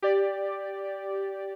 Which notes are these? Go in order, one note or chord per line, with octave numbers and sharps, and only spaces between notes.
G4 D5